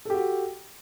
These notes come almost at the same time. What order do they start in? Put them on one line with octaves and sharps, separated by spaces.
A4 G4 F#4